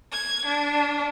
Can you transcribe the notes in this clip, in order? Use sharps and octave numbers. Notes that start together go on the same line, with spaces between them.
G#6
D4